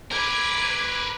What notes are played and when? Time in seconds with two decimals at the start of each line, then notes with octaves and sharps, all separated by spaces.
0.11 A#4 B4 D6 G#6